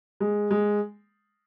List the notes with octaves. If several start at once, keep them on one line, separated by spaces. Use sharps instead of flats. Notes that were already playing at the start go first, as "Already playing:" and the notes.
G#3
G#3